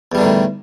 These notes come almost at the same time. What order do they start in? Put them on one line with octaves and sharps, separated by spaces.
E2 G3 D3 D#3 A2